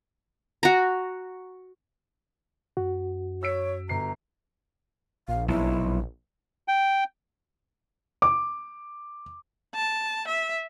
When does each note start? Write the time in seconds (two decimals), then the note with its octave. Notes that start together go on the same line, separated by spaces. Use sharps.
0.63 F#4 A#5
2.77 F#2 F#4
3.43 C#5 E6 B6 D7
3.89 G1 A#5 C7
5.28 A#1 F5
5.48 B1 E4
6.68 G5
8.22 D6
9.75 A5
10.28 E5